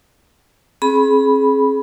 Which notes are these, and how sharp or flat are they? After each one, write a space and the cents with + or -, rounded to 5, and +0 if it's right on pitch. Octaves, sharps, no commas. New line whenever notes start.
C4 +40 G#4 +25 B5 -10